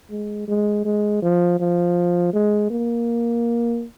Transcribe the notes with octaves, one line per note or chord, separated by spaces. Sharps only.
G#3
G#3
G#3
F3
F3
G#3
A#3